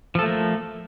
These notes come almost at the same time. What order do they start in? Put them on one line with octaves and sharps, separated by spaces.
F3 A4 A3 A#3